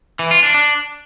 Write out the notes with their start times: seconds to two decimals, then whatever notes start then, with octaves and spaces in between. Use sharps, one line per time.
0.19 E3
0.31 F4
0.43 D4
0.54 D4